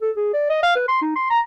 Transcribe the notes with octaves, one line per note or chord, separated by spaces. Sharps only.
A4
G#4
D5
D#5
F5
B4
C6
D#4
C6
A#5